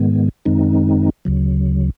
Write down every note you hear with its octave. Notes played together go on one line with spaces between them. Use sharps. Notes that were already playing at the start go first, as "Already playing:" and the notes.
Already playing: G#2 D#3 G#3 B3
F#2 D#3 G#3 C4 D#4
D2 C#3 F#3